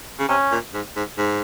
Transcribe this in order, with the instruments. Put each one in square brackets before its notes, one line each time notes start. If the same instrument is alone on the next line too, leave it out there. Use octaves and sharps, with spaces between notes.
[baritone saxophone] C#3
[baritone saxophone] C3 [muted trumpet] C#4
[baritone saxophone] A#2
G#2
G#2
G#2